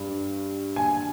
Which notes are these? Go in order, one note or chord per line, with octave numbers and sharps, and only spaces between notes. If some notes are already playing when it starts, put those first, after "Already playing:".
Already playing: G2
G#5